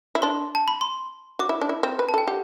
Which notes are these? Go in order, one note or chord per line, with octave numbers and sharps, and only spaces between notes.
E4
D4 C6
A5
B5
C6
F#4 D6
E4
D4
E4
C4
B4
A5
A4 G5
G4 F#5